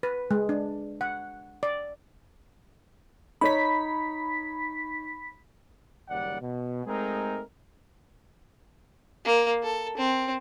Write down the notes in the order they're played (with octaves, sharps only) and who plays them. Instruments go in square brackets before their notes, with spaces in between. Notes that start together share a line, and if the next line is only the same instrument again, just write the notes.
[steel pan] B4
G#3
D4
F#5
D5
[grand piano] D#4 C#5 [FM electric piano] B5 B6
[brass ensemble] F#1 D#2 G3 D5 F#5
B2
G#3 A3 C4 D#4 G#4 A#4
[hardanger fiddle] A#3
A4
C4